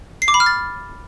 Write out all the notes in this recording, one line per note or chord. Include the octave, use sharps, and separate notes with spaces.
C7
D6
B5
F6
A6